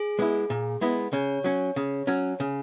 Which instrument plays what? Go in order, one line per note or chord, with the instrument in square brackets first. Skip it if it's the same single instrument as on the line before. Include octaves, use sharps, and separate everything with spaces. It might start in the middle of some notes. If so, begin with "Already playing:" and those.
Already playing: [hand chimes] G#4
[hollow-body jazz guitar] G#3 B3 E4
A#2
G#3 B3 E4
[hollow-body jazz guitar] C#3 [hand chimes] C#5
[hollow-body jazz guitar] F#3 C#4
C#3
F#3 C#4
C#3